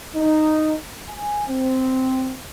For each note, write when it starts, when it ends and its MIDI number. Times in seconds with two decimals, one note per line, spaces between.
0.16 0.73 63
1.09 1.42 80
1.48 2.32 60